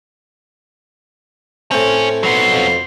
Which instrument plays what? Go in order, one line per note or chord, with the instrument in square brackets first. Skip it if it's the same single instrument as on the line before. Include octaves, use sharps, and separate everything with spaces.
[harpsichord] A2 C4 [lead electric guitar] C#4
[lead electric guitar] F#3 B3 [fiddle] C6
[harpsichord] F2